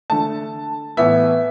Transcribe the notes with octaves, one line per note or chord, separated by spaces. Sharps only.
D3 A3 A5
A2 E3 B3 E5